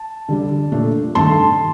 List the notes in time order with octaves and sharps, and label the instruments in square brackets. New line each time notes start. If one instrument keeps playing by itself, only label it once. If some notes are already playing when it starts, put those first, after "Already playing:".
Already playing: [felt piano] A5
D3 G3 D4
A#2 A3 D4
G2 D#3 A3 A5 C6